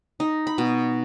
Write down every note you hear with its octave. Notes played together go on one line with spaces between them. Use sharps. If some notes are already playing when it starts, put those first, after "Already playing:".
D#4
B5
B2